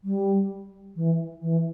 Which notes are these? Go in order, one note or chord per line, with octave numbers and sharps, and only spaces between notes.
G3
E3
E3